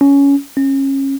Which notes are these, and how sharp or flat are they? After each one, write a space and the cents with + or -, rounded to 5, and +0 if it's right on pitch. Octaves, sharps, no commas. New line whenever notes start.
C#4 +15
C#4 -25